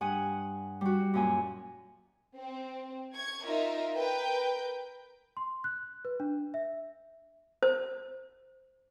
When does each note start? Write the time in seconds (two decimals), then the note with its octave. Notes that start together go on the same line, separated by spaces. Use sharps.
0.01 G2 F#5 G#5 D#6
0.81 G3 F#4
1.14 F#2 A#2 G#5
2.37 C4
3.14 C#6 G#6
3.44 D#4 F4 A#4 E5
3.95 A#4 B4 G5 G6
5.37 C6
5.64 F#6
6.05 B4
6.20 D4
6.54 E5
7.63 C5